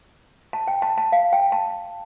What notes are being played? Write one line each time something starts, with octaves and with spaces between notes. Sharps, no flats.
A5
G5
A5
A5
F5
G5
A5